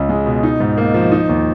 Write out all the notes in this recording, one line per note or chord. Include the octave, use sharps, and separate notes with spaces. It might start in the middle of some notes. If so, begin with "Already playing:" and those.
Already playing: C#2 C#4
G#3
B2
D#4
G#2
A#3
F3
D#4
D#2